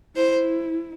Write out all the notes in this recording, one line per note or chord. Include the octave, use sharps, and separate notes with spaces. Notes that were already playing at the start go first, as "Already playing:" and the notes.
E4 C5